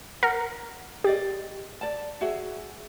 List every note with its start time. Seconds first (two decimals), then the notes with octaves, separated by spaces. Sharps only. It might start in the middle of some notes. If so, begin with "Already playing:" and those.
0.23 A#4 F#5
1.04 G4 G#4 D5 D#5
1.81 D5 A5
2.21 F#4 G#4 E5